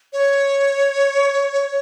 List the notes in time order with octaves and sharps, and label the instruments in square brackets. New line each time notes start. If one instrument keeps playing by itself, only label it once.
[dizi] C#5